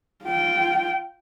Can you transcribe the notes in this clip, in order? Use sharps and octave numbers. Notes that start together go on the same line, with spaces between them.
F4 G5